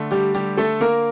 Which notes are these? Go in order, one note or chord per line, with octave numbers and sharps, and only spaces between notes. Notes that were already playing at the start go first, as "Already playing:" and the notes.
Already playing: D3 A3
G3 G4
G3 G4
A3 A4
A#3 A#4